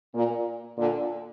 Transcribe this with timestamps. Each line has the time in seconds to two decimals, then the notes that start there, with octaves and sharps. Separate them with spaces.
0.15 A#2
0.78 A#2 D3